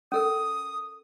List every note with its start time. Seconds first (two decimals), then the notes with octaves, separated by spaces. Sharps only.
0.12 C#4 A4 A#4 D#6